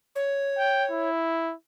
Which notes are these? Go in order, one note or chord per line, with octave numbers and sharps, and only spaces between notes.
C#5
G5
E4